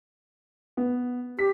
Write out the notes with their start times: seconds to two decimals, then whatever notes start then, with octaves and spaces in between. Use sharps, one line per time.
0.77 B3
1.39 G4 B6